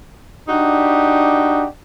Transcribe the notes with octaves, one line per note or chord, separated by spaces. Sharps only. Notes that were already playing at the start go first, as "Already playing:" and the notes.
D4 D#4 F#4 G4